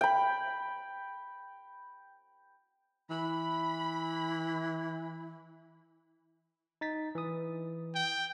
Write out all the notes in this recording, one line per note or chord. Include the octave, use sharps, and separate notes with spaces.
G5 B5
E3 B5
D#4 A6 B6
E3 D#6
G5